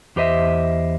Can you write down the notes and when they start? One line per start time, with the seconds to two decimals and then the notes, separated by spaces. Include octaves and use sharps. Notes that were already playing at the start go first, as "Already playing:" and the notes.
0.16 E2 G4 C5 D#5 E5